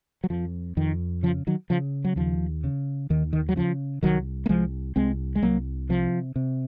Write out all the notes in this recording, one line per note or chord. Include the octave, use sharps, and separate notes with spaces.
F#3
F2 F3
F2 D#3
C#3 F3
D#3 F#3
C#3 F3
F#3
D#2 F3
C#3
D#2 D#3
D#3
F#3
C#3 F3
C2 D#3 F#3
A#3
C2 F3 G#3
C2 G#3 C4
G#3
C2 F#3 A#3
C3 F3
C3